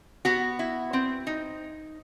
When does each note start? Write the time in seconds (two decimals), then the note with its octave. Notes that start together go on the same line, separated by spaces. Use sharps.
0.25 B3 F#4
0.59 E4
0.93 C4
1.27 D#4